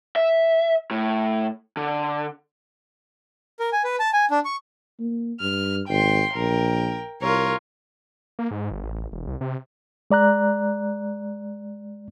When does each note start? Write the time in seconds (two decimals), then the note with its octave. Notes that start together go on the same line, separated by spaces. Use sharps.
0.16 E5
0.91 A2
1.77 D3
3.60 A#4
3.72 G#5
3.84 B4
4.00 A5
4.13 G#5
4.31 D4
4.45 C#6
5.00 A#3
5.41 G2 F6
5.89 G#1 G5 C6
6.36 A#1 A#4 G5
7.22 C2 F4 A#4 C#5
8.39 A#3
8.51 G#2
8.71 G1
8.83 A1
9.12 E1
9.27 C2
9.41 C3
10.11 G#3 D5 A#5 F#6